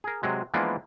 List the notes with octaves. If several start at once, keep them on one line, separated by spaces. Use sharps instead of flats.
G#4 A#4
C3 F#3 G#3
E3 F3 G#3 A#3 B3 D4